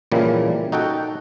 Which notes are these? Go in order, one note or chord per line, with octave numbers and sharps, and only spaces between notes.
A#2 C#3 E3 F3 G3 A#3
D#4 F#4 A4 F#5 G5